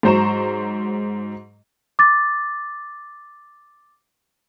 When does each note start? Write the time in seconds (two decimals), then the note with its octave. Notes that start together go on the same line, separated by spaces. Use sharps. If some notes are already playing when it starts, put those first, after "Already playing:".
0.03 G#2 F#3 C5 A#5 C#6 E7
1.99 D6 A6